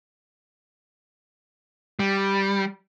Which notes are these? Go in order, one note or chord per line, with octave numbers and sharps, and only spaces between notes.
G3